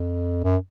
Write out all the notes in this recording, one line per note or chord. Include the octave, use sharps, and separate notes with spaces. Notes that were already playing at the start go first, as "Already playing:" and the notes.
Already playing: F2
F#2